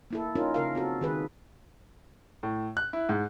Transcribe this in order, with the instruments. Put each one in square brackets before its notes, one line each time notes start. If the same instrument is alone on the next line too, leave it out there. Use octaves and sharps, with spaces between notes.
[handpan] A#3 E4 A4
C#4 D#4 F4 A#4
C#3 A#4 F5
C4 F#4 A4
D#3 G#4 B4
[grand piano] A2
F#6
E4
G#2